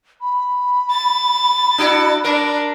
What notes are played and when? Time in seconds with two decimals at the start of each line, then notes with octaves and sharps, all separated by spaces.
0.21 B5
0.91 A6
1.78 D4 E4 F#4
2.24 D4 A#4